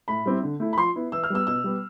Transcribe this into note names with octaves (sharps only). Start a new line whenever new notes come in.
A2 B5
G3 C4 E4
D3
A3 E4
B5
F3 C6
B3 E4
E3 E6
F6
G3 B3 E6
B2 E6
G3 B3